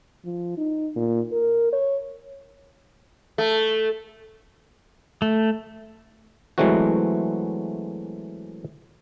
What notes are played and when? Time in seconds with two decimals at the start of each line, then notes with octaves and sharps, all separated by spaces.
0.25 F3
0.57 D#4
0.96 A#2
1.32 A#4
1.72 C#5
3.38 A3
5.22 A3
6.58 E3 F#3 G#3 A3 C4 F#4